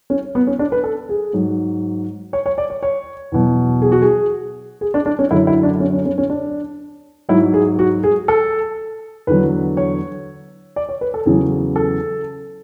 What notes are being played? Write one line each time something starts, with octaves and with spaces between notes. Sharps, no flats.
C#4
B3
C#4
D4
B4
A4
G#4
G#2 F#3
C#5
C#5
D5
C#5
C#5
E2 B2 F#3
G#4
F#4
G#4
G#4
D4
D4
C#4
F#2 D3 F#3 E4
E4
D4
C#4
C#4
C#4
C#4
D4
G#2 F#3 E4
G#4
F#4
G#4
A4
E2 D3 F#3 B4
C#5
D5
C#5
B4
A4
E2 C#3 F#3 G#4
A4